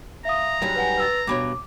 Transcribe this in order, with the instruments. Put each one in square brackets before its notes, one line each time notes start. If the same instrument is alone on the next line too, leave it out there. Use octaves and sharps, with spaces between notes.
[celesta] E5 F5 D#6 [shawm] A#5
[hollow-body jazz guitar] G#2 F#3 G3
[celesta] B4 F#5 G#5
B4 E6 A6
[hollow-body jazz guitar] G2 B2 C#5 [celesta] D6